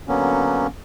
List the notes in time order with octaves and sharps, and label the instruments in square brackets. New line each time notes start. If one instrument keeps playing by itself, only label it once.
[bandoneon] D3 F#3 A#3 B3 C#4